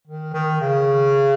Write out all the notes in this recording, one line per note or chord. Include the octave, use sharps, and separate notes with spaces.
D#3
D#3
C#3